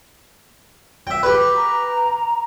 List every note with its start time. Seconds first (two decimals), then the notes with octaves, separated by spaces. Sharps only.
1.07 E5 G5
1.23 G4 B4
1.56 A#5